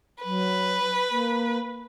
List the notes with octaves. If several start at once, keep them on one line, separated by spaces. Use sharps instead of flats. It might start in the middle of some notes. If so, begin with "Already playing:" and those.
F#3 B4
A#3